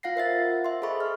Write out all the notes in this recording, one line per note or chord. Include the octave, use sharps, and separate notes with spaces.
F4 F5 F#5 A#6 C7
A#4 C5 E5 A6
E5 C6
G#4 A4 C5 D#5 B5 C#6
F6